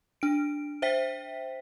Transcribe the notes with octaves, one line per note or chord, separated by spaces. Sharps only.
D4 D7
C5 E5 G5 B6